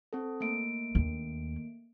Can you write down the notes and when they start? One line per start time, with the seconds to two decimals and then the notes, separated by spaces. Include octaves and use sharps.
0.13 C4 A4
0.40 A3 A#3 D7
0.95 D#2 D4